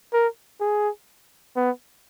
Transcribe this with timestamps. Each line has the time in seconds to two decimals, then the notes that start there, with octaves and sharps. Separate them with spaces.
0.13 A#4
0.61 G#4
1.56 B3